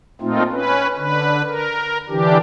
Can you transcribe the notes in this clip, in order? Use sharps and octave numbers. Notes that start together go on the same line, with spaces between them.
A#2 A3 C4 D#4 F4
C#4 B4
D3 B4
A#4
D3 E3 D4 G4